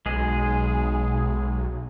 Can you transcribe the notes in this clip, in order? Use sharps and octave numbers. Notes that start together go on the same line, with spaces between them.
B1 G#3 G#4